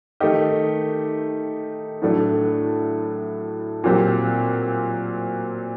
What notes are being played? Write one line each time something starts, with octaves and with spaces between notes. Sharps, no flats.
D#3 A3 D#4 G4
A2 F#3 A3 D4
A#2 F#3 C4 G4